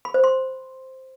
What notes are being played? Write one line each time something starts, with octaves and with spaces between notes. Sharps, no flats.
B5
C5
C6